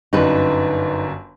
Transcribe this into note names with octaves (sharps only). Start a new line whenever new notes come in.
G1 F#2 D4 D#4 B4